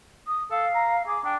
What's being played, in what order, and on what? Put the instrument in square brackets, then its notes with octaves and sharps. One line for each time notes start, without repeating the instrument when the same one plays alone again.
[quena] D#6
[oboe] A4 [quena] F5
[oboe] A#5
[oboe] G#4 [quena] D6
[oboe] D4 [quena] G5